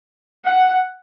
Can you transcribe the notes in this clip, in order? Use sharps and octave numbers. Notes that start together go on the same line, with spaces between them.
F#5